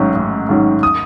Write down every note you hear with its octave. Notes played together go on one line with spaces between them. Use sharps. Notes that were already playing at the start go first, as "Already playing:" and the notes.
Already playing: A1 G#2 D#3 F#3 C#4
A1
G#2 D#3 F#3 C#4
D#6